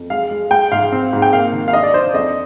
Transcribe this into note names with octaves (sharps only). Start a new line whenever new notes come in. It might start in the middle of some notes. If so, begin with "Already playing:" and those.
Already playing: F2
G#3 F5
G#3
G#3 G5
G#2 F5
C4
G#2
G5
A#3 F5
D#3
F5
D4 D#5
D5
D4 C5
F2 D#5